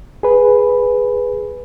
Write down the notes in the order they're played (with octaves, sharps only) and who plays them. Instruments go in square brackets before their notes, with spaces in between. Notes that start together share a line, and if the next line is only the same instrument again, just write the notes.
[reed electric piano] G#4 B4